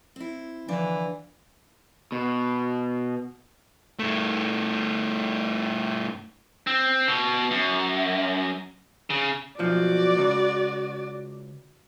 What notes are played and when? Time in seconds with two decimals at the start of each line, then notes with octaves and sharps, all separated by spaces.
0.16 C4 E4
0.68 D3 E3 F3 D4
2.12 B2
3.99 G2 A3
6.67 C4
7.08 B2
7.51 F#2
9.10 C#3
9.59 B1 F3 F#4 D5
10.17 C#2